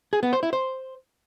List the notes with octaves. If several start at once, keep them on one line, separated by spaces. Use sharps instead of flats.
G#4
B3
C5
E4
C5